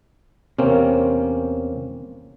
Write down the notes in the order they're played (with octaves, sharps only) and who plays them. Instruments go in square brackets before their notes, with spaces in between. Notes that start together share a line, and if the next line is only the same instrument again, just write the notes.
[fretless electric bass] E2 C3 [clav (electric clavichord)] A#3 C4 C#4